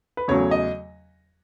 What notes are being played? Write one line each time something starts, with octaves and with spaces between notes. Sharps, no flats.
B4
E2 C#3 F#3 A3 C#5
D#5